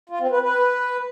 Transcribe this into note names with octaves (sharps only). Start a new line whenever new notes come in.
F4
C4
B4
B4